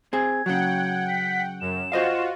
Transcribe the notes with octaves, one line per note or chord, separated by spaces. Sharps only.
C4 G#4 G#6
C#3 F#3 F#5 G5
B6
F#2 E7
F4 F#4 C5 D#5 F5